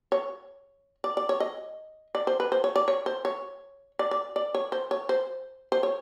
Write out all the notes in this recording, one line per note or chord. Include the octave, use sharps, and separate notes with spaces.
C#5
D5
D5
C#5
D#5
D5
C5
B4
C5
C#5
D5
C#5
C5
C#5
D5
D5
D5
C#5
C5
C#5
C5
C5
C#5